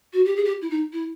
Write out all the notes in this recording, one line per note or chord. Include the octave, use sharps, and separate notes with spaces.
F#4
G4
G#4
G4
E4
D#4
E4